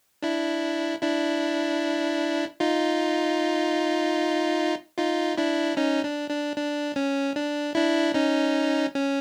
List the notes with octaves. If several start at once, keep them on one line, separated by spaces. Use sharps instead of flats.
D4 E4
D4 E4
D#4 F4
D#4 F4
D4 E4
C#4 D#4
D4
D4
D4
C#4
D4
D4 E4
C#4 D#4
C#4